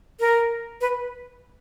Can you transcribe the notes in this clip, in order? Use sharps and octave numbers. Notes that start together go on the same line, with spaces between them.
A#4
B4